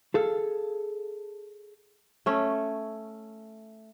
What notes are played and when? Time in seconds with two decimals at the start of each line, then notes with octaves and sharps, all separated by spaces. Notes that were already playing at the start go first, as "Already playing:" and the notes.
0.14 G#4 A4 F5
2.26 A3 C#4